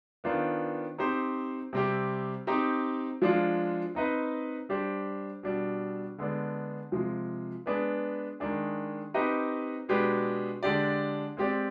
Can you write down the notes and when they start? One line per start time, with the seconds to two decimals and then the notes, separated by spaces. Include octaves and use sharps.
0.24 D#3 B3 D4 F4 C5
0.98 C4 D#4 G4 C5
1.73 C3 G3 C4 G4
2.47 C4 D#4 G4
3.22 F3 G#3 D4 F4
3.95 C4 D#4 B4 D#5
4.69 G3 D4 G4 C5
5.43 B2 G3 D4
6.18 D3 G#3 B3 D4
6.92 C3 F3 G#3
7.66 G#3 B3 D4 G#4 B4
8.40 D#3 G#3 D4 G#4
9.14 C4 D#4 G4 B4 D#5
9.89 B2 G#3 D4 G4 B4
10.63 D3 G#3 D4 G4 D5
11.37 G#3 C4 G4 D5